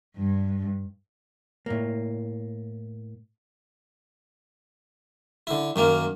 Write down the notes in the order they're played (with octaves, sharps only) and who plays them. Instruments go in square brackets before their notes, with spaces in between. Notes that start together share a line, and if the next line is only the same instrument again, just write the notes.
[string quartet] G2
[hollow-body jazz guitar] A2 A#3
[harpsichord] D3 E4
F#2 D#3 A#3